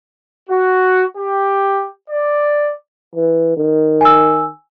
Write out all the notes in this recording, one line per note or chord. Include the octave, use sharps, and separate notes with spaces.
F#4
G4
D5
E3
D#3
G#5 E6